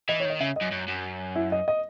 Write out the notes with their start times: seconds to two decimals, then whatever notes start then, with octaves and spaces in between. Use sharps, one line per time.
0.09 E3 D#5
0.20 C#5
0.25 D#3 D#5
0.40 C#3 E5
0.56 D#5
0.62 F#2
0.72 F#2
0.88 F#2
1.36 E4
1.52 D#5
1.68 D#5